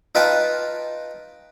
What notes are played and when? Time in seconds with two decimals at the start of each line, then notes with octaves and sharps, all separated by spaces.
0.15 D#4 F4 B4 D#5 G5 A5